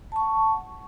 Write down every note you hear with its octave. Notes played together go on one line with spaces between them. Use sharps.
F#5 A5 C#6